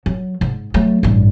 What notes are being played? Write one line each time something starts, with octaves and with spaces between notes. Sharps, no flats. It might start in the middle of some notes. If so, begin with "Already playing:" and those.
F#3
G#2
F#3 A3
A1 G2